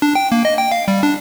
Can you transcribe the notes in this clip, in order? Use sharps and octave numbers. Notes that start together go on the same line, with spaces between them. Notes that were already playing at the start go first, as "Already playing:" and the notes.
D4
G5
A#3
D#5
G5
F5
G3
D4